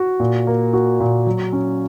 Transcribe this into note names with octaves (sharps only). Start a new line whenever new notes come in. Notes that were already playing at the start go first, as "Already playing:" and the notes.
Already playing: F#4
A#2
A#3
F#4
A#2
F#3
C#4